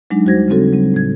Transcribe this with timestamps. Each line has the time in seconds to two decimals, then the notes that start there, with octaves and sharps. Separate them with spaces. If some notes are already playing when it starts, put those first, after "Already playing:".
0.11 F#3 G#3 D4 D#4
0.25 D#2 G3 F#4 C5 G#6 A#6
0.48 C#3 F#3 G3 C4 F#4 A4
0.72 F#3 G3 C4
0.94 A2 G#6